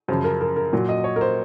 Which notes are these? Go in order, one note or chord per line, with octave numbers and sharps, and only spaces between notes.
F#2 C#3 F3 C5
A#4
A#4
A#4
A#2 F#3
D#5
C#5
A#4
C5